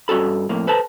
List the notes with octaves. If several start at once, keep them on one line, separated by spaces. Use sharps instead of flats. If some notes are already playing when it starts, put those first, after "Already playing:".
G2 C#4 F#4 A4 B5
F2 A2 A#3
A4 B4 C5 A5